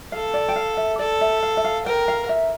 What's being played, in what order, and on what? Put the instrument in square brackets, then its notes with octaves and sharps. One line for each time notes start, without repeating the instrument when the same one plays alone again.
[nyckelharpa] A4 [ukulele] F5
[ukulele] D5
G5
F5
E5
[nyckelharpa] A4 [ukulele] D5
[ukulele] E5
F5
E5
F5
[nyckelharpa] A#4 [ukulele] G5
[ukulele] F5
E5